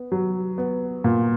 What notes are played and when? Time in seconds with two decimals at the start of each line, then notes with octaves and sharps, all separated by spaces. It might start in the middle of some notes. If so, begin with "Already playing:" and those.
Already playing: B3
0.12 F#3
0.58 B3
1.04 A#2